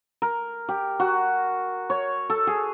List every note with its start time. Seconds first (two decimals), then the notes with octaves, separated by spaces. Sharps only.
0.22 A#4
0.69 G4
1.00 F#4
1.90 C#5
2.30 A4
2.47 G#4